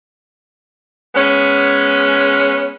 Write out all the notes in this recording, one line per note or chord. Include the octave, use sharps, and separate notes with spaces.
G#3 B3 C#4